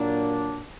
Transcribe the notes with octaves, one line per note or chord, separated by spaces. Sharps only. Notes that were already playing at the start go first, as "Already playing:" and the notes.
Already playing: A#2 F#3 A#3 D4